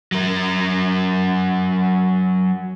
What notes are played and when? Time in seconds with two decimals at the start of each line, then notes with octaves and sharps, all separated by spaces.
0.12 F#3 A#4